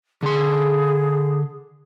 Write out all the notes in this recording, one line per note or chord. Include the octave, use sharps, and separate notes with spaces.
D3 G#4 C6